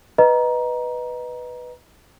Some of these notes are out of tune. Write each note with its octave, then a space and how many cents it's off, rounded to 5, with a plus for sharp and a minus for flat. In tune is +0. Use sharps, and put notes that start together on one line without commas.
B4 +0 D#5 +0 A#5 +15